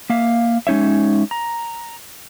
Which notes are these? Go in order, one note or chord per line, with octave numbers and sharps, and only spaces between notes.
A#3 E5 F5
G#3 C#4 D#4 C#5 E5
A#5